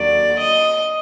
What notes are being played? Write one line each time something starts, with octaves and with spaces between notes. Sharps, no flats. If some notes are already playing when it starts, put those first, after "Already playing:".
Already playing: D#2 D3 F#3 D5
D#5